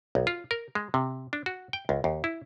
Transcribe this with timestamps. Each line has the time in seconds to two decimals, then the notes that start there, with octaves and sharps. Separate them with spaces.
0.15 B1
0.27 F4
0.51 A#4
0.75 G#3
0.94 C3
1.33 D4
1.46 F#4
1.73 G5
1.89 C#2
2.04 D#2
2.24 E4